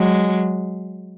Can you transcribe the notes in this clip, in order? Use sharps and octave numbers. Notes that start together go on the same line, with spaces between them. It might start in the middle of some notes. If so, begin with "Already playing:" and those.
Already playing: F#3 G#3